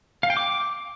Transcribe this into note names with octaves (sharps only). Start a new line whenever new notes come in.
F5
G5
D6